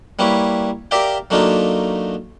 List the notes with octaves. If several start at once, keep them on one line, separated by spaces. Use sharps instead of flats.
G3 A#3 E4 B4 C#5
G4 A#4 D5 E5 F5 G5
F#3 A3 A#3 D4 D#4 F4